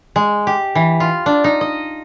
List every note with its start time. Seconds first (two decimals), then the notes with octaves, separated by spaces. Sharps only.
0.16 G#3
0.47 G4
0.75 E3
1.00 F4
1.26 D4
1.44 D#4
1.61 D#5